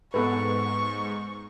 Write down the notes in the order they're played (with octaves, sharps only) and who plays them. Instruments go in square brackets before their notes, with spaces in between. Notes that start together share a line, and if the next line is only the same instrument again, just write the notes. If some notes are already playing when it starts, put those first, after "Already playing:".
[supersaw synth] G#2 [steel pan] B3 A4 B4 [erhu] C#6